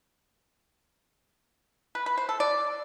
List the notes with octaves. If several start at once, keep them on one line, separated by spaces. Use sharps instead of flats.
B4
B4
C5
A4
D5